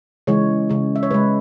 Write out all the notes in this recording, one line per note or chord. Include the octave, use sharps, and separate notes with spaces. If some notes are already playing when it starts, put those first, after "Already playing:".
C#3 E3 G#3 C#5
C#3 G#3
E5
C#5
C#3 G#3 B4